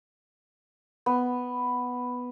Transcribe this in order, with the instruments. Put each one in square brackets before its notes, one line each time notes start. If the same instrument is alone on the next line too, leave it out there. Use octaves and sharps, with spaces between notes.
[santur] B3